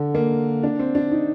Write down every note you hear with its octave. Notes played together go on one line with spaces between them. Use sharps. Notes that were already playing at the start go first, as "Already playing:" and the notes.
Already playing: D3
A#3
D4
C4
D4
D#4